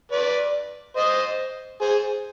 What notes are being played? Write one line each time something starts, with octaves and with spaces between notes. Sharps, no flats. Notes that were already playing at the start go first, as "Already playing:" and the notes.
B4 D5
C5 D#5
G#4 C5